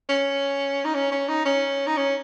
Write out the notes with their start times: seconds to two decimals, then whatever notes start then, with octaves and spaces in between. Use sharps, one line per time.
0.09 C#4
0.85 D#4
0.94 C#4
1.12 C#4
1.29 D#4
1.46 C#4
1.87 D#4
1.97 C#4